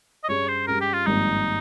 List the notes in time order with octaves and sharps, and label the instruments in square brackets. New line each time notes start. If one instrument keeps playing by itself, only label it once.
[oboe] D#5
[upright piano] G2 G3 C#4 G#4 [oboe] C#5
[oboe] C5
[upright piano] G2 G3 C#4 G#4 [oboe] A#4
[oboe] G4
F4
[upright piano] G#1 G2 F3 A#3 [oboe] D#4